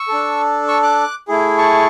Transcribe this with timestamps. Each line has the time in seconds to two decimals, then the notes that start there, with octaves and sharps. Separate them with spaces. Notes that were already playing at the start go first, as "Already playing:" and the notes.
Already playing: C#6 E6
0.08 D4 A4
0.68 C#6 E6
0.83 D6 F#6
1.28 A3 E4 G#4
1.58 A5 C#6